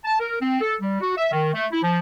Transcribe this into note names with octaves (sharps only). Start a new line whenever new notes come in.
A5
A#4
C4
A4
G3
F#4
E5
D#3
A3
E4
F3